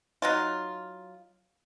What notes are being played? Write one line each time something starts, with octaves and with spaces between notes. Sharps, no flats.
F#3 D#4 F4